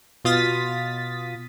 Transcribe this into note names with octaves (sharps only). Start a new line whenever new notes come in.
B2 F4 D#6 A6 B6